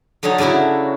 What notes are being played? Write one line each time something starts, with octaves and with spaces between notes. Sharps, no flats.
D3 F#3 D#4 A4 C#5
C#3 F#3 D4 E4 F#4